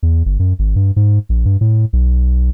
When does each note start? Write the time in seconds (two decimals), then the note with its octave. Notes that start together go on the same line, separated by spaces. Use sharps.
0.03 E2
0.26 G1
0.39 F#2
0.59 G#1
0.76 G2
0.96 G#2
1.29 A#1
1.45 G2
1.61 A2
1.93 B1